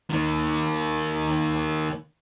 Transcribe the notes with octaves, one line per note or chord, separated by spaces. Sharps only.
D#3 A#3